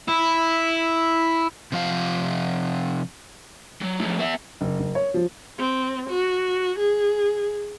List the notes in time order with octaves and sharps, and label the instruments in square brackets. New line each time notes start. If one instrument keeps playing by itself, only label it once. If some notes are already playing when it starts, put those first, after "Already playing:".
[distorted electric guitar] E4
[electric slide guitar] C3 F3 F5
[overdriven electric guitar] F#3
A2 F3
B3 E5
[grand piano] F#1
F#1
C#5
F3
[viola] C4
F#4
G#4